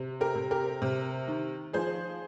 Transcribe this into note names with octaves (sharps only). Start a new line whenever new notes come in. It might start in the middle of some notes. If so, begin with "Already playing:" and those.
Already playing: C3
G4 A#4
C3
G4 A#4
C3
D#3
F3 G#4 C5